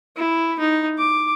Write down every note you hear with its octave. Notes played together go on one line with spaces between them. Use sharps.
E4
D#4
D6